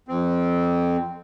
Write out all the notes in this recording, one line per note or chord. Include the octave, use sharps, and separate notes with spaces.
F2 C4